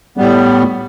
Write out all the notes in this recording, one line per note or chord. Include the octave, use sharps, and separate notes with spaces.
A2 G3 B3